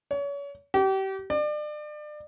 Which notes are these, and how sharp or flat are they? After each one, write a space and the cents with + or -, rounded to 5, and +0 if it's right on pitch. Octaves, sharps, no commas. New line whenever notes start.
C#5 +35
G4 -30
D5 +35